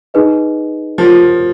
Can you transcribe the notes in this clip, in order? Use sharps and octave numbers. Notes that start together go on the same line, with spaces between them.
D#4 G#4 B4 D#5
F3 G4 A#4 C#5 F#5